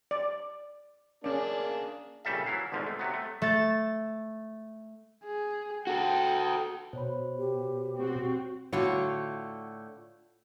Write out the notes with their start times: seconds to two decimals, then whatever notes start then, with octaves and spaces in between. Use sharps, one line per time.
0.11 D5
1.24 A#3 C#4 D4 G#4 D5
2.25 A#1 C#3 G3 A4 E5
2.46 E3 F#3 E4 F5
2.72 G#1 B2 D3 F3
2.86 A3
2.99 C3 F#3 B3
3.14 A3
3.42 A3 A6
5.24 G#4
5.87 F#4 A4 G5
6.93 B2 C5 C#5 B5
7.38 G4
7.97 C4 F#4
8.73 A2 D3 F4 F#4 C#5